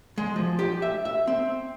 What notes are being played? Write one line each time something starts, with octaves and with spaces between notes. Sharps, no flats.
G#3
F3
G4
E5
E5
C4